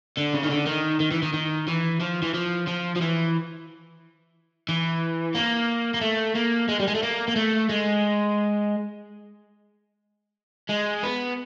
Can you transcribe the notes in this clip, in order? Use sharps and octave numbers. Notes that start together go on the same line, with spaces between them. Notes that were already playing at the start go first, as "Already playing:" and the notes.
D3
C#3
D#3
D3
D#3
D#3
E3
D#3
D#3
E3
F3
E3
F3
F3
F3
E3
E3
A#3
A#3
A3
A#3
G#3
G3
G#3
A3
A#3
A#3
A3
G#3
G#3
B3